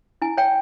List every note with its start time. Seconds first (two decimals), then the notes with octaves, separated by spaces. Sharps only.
0.22 E4 G#5
0.37 C#5 G5